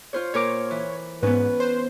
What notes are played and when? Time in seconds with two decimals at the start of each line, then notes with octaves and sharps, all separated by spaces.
0.13 F4 C5 C#5
0.34 A#2 A#4 C#5 D6
0.71 E3
1.23 G#2 B3 C#4 B4
1.60 C5